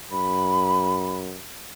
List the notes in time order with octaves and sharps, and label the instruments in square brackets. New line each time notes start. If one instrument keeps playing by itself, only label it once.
[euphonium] F#2 [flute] B5